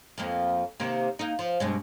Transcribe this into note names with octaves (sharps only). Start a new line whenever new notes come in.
F2 F3 A#3
C3 D#3 A#3
A#3 D#4
F3
G2 B2 G#3